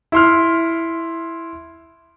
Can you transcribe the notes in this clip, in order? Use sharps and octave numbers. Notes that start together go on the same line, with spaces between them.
E4 C6 F6